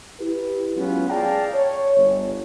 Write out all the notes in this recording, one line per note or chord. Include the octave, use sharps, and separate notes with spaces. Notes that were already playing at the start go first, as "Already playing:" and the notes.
E4 G4 B4
F#3 G#3 B3 C#4 F4
G#4 D5 F5 G5 A5 A#5
C#5
G1